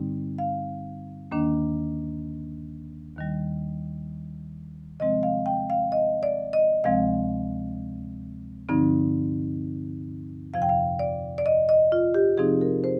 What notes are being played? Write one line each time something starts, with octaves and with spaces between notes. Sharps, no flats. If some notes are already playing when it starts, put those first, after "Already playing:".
Already playing: G2 D3 G3 C4 D#4
F5
D#2 D#3 A#3 D4
D#2 D#3 G3
C3 F3 G#3 C4 D#5
F5
G5
F5
D#5
D5
D#5
D2 C3 F3 G#3 C4 F5
G2 D3 F3 C4 D#4
F2 C3 F3 F5
G5
F5
D5
D5
D#5
D#5
F4
G4
C3 F3 C4 D#4 G#4
A#4
C5